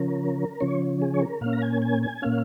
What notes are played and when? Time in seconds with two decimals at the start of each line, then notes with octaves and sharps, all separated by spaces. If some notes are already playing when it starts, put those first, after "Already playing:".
Already playing: C#3 F3 C#4 A#4
0.60 C#3 F3 C#4 C#5
1.02 G#4
1.14 C#5
1.21 A#4
1.41 A#2 A#3 C#4 F5
1.53 A#5
1.62 G#5
1.82 G#5
2.03 G#5
2.22 A#2 A#3 C#4 F5